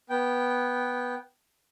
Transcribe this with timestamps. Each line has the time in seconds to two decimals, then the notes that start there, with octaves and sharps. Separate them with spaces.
0.10 B3 G5